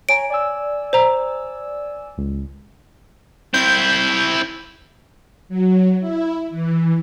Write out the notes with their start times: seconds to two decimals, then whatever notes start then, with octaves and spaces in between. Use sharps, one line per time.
0.09 C#5 G#5 A#5 D7
0.30 D5 G#5 E6
0.93 C5 A#5
2.17 C#2
3.54 C4 E4 G6
5.49 F#3
6.00 E4
6.50 E3